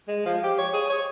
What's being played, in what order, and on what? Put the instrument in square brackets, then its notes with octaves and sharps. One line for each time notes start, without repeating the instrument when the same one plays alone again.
[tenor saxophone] G#3
F3
G4
C#5
G#4
C#5